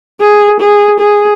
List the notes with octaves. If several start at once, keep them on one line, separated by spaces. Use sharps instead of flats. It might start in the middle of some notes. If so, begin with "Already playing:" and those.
G#4
G#4
G#4